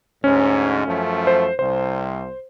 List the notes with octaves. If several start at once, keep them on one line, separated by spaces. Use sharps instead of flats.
D2 G#2 C#4
F#2 F3 A3
C5
C2 C5